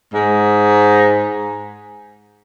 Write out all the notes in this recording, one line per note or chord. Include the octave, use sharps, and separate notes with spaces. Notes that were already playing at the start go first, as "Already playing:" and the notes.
G#2